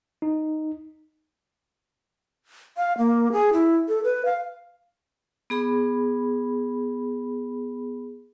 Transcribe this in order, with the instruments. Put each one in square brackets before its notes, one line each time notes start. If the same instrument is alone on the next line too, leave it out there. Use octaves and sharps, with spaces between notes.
[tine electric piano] D#4
[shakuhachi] F5
A#3
G#4
E4
A4
B4
F5
[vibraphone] B3 G#4 B5